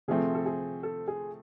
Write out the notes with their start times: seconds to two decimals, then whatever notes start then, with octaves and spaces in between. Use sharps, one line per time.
0.08 C3 F3 A3 C4 G#4
0.35 A4
0.46 G#4
0.83 A4
1.08 G#4